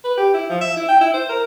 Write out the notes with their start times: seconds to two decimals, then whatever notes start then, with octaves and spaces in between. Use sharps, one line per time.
0.04 B4
0.18 G4
0.34 E4
0.50 F3
0.61 E5
0.77 E4
0.88 G5
1.01 E4
1.14 C5
1.29 A#4